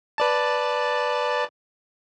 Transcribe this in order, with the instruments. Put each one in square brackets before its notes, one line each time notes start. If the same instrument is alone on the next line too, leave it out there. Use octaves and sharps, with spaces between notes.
[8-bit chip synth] B4 D5 A5